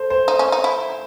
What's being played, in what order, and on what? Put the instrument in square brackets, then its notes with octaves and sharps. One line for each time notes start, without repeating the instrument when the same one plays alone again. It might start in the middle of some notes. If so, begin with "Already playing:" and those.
Already playing: [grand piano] A4 C5
C5
[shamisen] D#4
C#4
D#4
E4